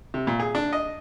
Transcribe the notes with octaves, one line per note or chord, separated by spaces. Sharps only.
C3
A#2
G#4
D4
D#5